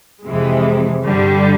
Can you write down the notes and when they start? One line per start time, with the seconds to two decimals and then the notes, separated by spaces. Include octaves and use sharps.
0.26 F2 C3 E3 G#3
1.04 G2 D3 G3